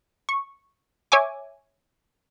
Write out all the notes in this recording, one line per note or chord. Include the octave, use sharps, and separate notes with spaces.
C#6
C#5 E5 G#5 D6